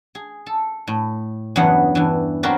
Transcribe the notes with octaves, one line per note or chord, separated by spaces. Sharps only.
G#4
A4
A2
E2 G2 C#3 F#3 B3 F#5
G2 E3
F#3 C4 F#4 A#4 B4 D5